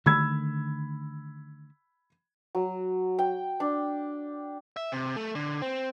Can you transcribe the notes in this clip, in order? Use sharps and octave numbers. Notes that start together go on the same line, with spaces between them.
D3 D#3 A3 B5 E6 G#6
F#3
G5
D4
E5
C3
A3
D3
C4